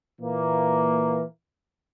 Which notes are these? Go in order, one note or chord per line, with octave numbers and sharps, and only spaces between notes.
A#2 E3 A#3